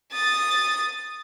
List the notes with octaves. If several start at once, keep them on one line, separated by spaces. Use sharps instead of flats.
D#6 A6